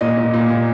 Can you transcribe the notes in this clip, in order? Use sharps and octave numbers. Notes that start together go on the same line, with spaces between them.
A#2 D#5
A#2
A#2
A#2